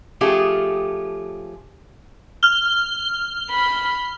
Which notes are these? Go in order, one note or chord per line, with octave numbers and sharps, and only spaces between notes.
F3 A3 C#4 F4 G4 G#4
F6 G7
B5